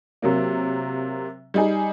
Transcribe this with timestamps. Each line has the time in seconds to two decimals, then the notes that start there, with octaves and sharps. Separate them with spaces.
0.22 C3 F#3 A#3
1.54 G3 D#4 G#4